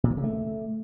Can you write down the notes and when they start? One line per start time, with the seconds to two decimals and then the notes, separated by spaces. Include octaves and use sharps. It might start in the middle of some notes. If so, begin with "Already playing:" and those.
0.04 A#2
0.10 D#3
0.17 C#3
0.24 A3